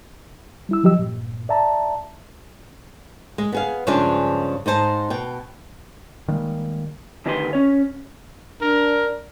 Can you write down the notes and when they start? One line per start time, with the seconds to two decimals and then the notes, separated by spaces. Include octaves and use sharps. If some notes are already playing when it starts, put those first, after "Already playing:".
0.69 G3 E4 E6
0.83 F3 F#3 G4 D#5 E6
0.99 G2 A#2
1.49 D5 E5 A5 A#5
3.38 G#3
3.52 B3 G#4 F5
3.87 G2 C#3 F3 G#3 D4 F4
4.66 G#2 D#4 C5 A5
5.10 B2 G5
6.28 D#3 G3 G#3 A#3
7.26 D2 D#3 G4 B4 G#5 C6
7.53 C#4 C#5
8.61 D4 A#4